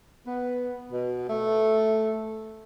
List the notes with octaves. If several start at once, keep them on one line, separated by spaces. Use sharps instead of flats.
B3
B2
A3